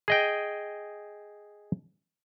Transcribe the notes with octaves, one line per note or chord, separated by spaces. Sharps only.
G#4 D#5 G5